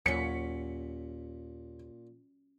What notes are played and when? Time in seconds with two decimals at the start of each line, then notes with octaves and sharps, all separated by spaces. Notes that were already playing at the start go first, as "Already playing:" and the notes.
0.06 D#2 A#2 F#3 C#4 B6 C#7